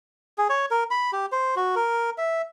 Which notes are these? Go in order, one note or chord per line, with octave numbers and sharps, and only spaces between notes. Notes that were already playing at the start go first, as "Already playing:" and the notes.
G#4
C#5
A#4
B5
G4
C5
F#4
A#4
E5